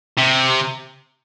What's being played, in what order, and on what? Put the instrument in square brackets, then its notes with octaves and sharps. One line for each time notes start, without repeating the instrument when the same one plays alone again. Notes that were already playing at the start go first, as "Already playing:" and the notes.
[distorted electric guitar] C3